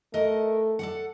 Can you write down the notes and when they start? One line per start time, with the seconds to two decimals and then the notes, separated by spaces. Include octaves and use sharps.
0.14 A3 A#4 D#5 F#5
0.79 A4 D5 F#5